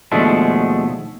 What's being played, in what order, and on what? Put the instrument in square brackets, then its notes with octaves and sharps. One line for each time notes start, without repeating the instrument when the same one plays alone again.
[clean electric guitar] D#2 B2 F3 G#3 A3 D4